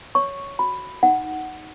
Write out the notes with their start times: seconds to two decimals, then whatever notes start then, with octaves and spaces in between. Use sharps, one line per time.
0.15 C#5 C#6
0.59 F#4 B5
1.03 D#4 F#5